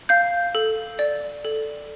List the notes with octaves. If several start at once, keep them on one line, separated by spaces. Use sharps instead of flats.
F5 G6
A4
D5
A4